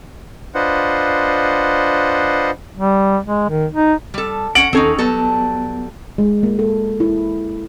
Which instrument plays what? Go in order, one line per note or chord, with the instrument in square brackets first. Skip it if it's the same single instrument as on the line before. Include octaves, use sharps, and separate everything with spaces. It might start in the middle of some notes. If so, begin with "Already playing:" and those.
[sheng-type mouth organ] D4 F4 B4 C5 D#5 F#5
[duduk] G3
G#3
D#3
D#4
[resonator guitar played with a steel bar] G3 A4
[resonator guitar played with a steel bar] C#4 F#5 [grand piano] D7 F#7
[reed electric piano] D#2 A4 [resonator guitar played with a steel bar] C4 C#4 D#4
[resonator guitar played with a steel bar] F#3 G3 A4 [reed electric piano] B3
[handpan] G#3
A#3
A4
E4